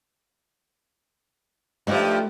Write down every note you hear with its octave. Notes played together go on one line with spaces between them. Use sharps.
G2 F3 A3 D#4 G4